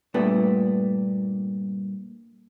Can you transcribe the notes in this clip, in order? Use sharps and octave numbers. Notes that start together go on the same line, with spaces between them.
G2 A#2 A3 B3 D4